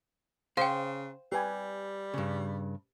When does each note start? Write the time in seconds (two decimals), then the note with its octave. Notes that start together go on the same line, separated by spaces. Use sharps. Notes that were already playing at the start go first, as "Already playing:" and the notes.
0.57 C#3 C5 F5 G5
1.32 G3 G4 B4 G#5
2.14 G2 C#3